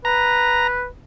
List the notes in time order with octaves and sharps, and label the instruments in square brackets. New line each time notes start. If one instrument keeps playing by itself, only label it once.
[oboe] B4 [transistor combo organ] A#5